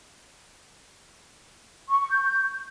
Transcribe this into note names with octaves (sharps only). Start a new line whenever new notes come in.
C#6
C#6
G6